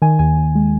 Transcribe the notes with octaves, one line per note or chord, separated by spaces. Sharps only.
D#3 G#5
D#2 G#5
D#2
G#3